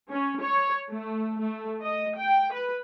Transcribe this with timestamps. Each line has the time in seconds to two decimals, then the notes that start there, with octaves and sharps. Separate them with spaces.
0.10 C#4
0.41 C#5
0.90 A3
1.39 A3
1.82 D#5
2.15 G5
2.53 B4